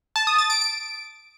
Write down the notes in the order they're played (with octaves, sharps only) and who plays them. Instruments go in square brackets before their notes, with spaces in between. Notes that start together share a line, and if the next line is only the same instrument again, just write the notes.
[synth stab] A5
D#6
A6
D7
D7